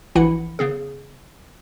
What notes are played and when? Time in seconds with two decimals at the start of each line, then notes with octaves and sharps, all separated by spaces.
0.15 A#1 E3 E4 F#5 B5 C#7
0.59 C#3 B3 G#4